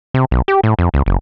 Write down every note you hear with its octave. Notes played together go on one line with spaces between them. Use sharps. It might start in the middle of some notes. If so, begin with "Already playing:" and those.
C3
B1
G4
A2
F2
C#2
F#1